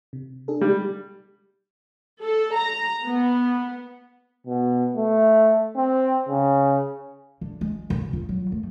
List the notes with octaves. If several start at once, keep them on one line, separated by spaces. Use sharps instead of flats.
C3
D4 G#4 A4
G3 G#3
A4
A#5
B3
B2
A3
C4
C#3
D3
G#3
C#3
F4
F#3
A3